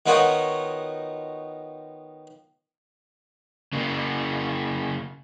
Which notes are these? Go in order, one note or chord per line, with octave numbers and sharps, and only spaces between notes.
D#3 B3 D#4 F4 F#4 C#5
C#3 A#3